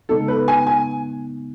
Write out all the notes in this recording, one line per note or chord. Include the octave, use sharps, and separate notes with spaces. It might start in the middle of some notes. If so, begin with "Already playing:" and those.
C#3 G#3 B3 D#4 A4
B4
G#5
G#5